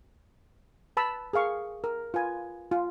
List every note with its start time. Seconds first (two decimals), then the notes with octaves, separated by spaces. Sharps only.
0.97 B4 A5 B5 E6
1.33 G#4 A#4 F5 C#6
1.84 A#4
2.14 F4 B4 G#5
2.72 F4